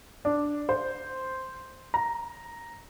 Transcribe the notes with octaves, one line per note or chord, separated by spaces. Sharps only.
D4
C5
A#5